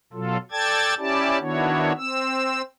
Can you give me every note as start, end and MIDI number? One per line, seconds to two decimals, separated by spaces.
0.13 0.37 47
0.13 0.37 54
0.13 0.37 65
0.13 0.37 69
0.51 0.94 69
0.51 0.94 74
0.51 0.94 79
0.51 0.94 81
0.51 0.94 92
0.51 0.94 93
0.98 1.38 61
0.98 1.38 64
0.98 1.38 67
0.98 1.38 74
0.98 1.38 81
1.40 1.92 51
1.40 1.92 59
1.40 1.92 62
1.40 1.92 64
1.40 1.92 66
1.40 1.92 73
1.97 2.62 60
1.97 2.62 88